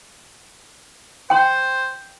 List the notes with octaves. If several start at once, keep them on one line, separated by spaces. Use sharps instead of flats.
C5 G5 C6